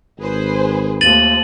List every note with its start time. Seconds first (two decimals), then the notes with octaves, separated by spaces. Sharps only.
0.19 G#1 G#4 B4 C5
1.01 D#2 F3 A3 A6 D#7 F#7